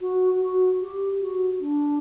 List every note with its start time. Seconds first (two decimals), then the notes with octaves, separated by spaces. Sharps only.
0.01 F#4
0.41 F#4
0.81 G4
1.20 F#4
1.61 D4